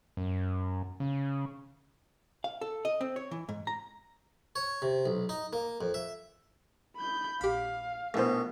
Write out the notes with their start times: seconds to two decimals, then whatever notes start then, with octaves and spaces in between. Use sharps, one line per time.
0.17 F#2
1.00 C#3
2.44 F5
2.61 A4
2.85 D#5
3.01 C4
3.16 C#5
3.31 E3
3.49 G#2
3.67 A#5
4.56 C#5
4.82 C3
5.06 B1
5.29 D#4
5.53 A#3
5.81 F2
5.94 E5
6.96 B5 G6
7.41 A#1 G4 F5 B5
8.14 A#1 B2 A3 E4 C5